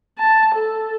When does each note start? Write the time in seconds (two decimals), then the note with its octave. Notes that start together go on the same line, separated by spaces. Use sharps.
0.18 A5
0.55 A4